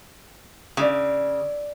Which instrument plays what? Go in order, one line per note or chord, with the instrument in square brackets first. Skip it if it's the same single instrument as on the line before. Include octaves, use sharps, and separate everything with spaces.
[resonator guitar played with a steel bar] C#3 [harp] E4 D5